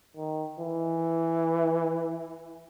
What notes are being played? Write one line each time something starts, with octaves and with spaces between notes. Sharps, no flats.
D#3
E3